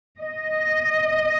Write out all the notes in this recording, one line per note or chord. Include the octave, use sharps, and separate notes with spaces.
D#5